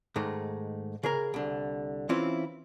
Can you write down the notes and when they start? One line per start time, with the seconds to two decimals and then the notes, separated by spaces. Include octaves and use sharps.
0.16 G#2 D#3 G#3 A3
1.03 C#3 G#4 A#4
1.34 C2 D3
2.09 E3 C4 C#4 E4 F4